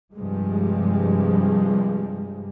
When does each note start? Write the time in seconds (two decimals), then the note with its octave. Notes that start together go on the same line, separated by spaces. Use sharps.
0.14 G2 C3 F3 G3 G#3